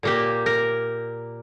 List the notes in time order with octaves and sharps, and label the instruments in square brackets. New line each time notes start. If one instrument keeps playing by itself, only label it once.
[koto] A#2 A#3 G4
A#4